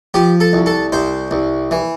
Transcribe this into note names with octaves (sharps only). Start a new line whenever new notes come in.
F3 G4
A4
C2
A4
C2 C5
C2
E3